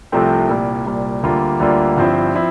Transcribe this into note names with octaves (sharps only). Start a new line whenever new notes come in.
C2 C3 F3 A3 C4
C2 A#2 G3
C2 A#2 G3
D2 D3 G3 A#3 F4
D2 D3 G3 A#3 F4
G1 G2 F3 C4 E4
F3 C4 E4